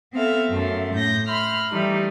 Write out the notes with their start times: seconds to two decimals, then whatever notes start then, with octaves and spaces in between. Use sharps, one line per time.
0.14 B3 C4 A4 E5 F5
0.52 F#2 A3 C6
0.95 A2 G6 A#6
1.27 E5 B5 C6 F6
1.70 E3 G3 A3 D#4